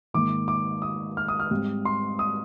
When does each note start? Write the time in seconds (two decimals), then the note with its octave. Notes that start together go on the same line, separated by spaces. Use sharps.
0.14 G#2 D#3 A#3 D6
0.48 D6
0.82 D#6
1.17 F6
1.28 D#6
1.40 F6
1.51 G#2 G3 C4
1.85 C6
2.19 D#6